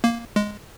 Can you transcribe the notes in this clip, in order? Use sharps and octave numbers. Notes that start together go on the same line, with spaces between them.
A#3
G#3